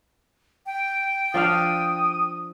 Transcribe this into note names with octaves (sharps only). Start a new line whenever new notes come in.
G5
F3 D4 F5 D#6